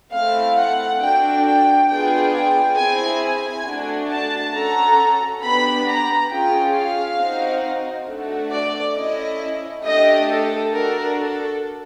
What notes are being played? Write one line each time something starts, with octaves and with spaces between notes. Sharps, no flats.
A3 C4 E4 A4 F5
F#5
D4 F#4 A4 G5
G5
B3 D4 F4 G#4 G5
G5
C4 E4 G#4 G#5
G#5
A3 D4 F#4
A5
C#4 F#4 A4 A#5
B3 D4 G4 B5
A#5
C#4 F4 G#4 G5
F5
C4 D#4 F#4
A3 D4 F#4 A4
D5
C#4 E4 A4 D#5
A3 D4 G4 D#5
A4
D4 F#4 A4 A#4
A4